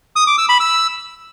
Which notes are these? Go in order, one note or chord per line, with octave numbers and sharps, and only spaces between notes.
D#6
D6
E6
B5
E6